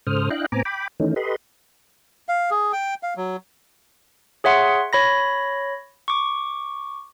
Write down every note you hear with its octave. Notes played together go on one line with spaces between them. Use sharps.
G#2 C#3 A4 C5 D#6 F6
D4 E4 D#5 F5 G5 F#6
A2 B3 C4 G#5 A#5 D6
G5 B5 D6
D#3 E3 A3 C#4 D#4
G4 A4 B4 D#5 B5 C6
F5
G#4
G5
F5
F#3
G#4 C#5 E5 F#5 C6
C#5 B5 A#6
C#6 D6